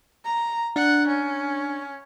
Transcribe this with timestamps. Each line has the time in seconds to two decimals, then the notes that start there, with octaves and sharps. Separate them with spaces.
0.25 A#5
0.76 D4 F#5
1.08 C#4